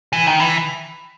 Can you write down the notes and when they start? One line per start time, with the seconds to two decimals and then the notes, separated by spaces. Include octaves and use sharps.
0.13 E3
0.27 D#3
0.40 E3